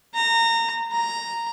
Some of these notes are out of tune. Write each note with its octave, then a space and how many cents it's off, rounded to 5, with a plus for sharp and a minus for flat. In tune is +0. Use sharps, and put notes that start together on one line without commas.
A#5 -25
A#5 -5